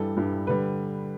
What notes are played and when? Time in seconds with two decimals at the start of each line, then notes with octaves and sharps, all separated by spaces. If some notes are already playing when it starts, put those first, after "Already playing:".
Already playing: G2 E3 G3 A4
0.16 G2 E3 G3
0.47 D3 G3 B4